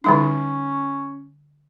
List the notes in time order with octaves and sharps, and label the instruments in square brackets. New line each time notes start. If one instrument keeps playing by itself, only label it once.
[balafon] D3 G3 D#4 [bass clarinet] C#4